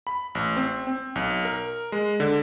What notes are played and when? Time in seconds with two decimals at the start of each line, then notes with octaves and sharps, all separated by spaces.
0.07 B5
0.35 A1
0.57 C4
0.87 C4
1.16 B1
1.45 A#4
1.92 G#3
2.20 D3